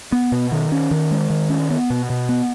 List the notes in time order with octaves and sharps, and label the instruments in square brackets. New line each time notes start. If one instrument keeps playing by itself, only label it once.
[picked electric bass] B3
B2
D#3
C#4
D#3
G#3
D#3
C#4
B3
B2
B2
B3